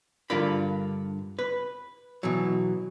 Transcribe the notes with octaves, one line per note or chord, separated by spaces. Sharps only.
G2 D3 F4 A#4 F5 B5
B4
B2 E3 F#3